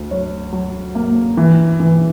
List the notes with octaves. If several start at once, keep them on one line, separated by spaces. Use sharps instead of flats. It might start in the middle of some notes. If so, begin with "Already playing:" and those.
Already playing: D2
F#3 C#5
F#3
A#3
E3
E3